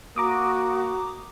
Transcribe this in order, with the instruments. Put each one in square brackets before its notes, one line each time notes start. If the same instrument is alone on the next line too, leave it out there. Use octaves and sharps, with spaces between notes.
[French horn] A#3 [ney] F#4 [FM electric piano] A#5 D6 D#6